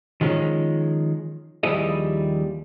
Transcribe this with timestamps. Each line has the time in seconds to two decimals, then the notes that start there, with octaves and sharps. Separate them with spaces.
0.21 D#3 F3 G#3 C#4
1.63 D#2 F3 G3 E4 G#4 D#5